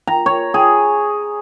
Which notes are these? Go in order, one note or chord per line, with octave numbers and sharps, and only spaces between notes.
A#5
C#5
G#4